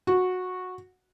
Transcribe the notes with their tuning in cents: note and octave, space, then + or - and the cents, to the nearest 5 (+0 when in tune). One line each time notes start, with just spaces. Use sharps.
F#4 -15